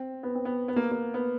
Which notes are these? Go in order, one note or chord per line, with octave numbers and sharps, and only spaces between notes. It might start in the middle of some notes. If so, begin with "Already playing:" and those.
Already playing: C4
B3
C4
B3
B3
A#3
A#3
B3